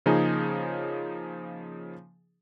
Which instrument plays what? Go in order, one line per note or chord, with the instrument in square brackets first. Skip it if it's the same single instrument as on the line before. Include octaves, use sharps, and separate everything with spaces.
[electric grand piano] C#3 F3 A#3 C#4 D#4 G#4